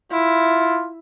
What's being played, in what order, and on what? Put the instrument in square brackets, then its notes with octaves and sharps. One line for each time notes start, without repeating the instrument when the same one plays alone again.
[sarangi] E4 [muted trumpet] F4